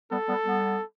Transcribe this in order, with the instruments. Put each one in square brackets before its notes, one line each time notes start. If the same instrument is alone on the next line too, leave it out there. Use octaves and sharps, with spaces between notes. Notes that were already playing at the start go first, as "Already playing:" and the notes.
[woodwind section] G3 B3 [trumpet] A4
[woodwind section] G3 B3
G3 B3